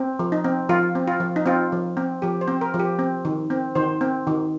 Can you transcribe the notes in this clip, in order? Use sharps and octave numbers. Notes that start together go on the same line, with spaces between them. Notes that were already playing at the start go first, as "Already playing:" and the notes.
Already playing: C4
F3
D#4
C4
F3 F4
C4
F4
F3
D#4
C4 F4
F3
C4
F3 G4
C5
C4
A#4
F3
G4
C4
D#3
C4
D#3 C5
C4
D#3